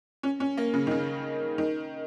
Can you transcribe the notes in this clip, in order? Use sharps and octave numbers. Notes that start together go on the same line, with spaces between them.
C#4
C#4
A#3
C#3
D#3
C#3
D#3